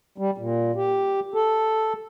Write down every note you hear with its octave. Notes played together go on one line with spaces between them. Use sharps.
G3
A#2
G4
A4